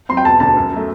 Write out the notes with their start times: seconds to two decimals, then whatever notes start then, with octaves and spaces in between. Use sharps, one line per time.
0.09 F#3 C4 C6
0.17 G5
0.25 E1 A5
0.40 D2 D3 A5
0.56 F#2
0.72 F#3 A3